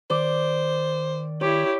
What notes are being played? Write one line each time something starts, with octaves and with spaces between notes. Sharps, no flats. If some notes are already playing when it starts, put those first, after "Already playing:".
D#3 C5 D5
E4 G4 C#5